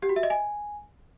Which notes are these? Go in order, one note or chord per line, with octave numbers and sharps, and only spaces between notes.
G4
F#4
E5
D#5
G#5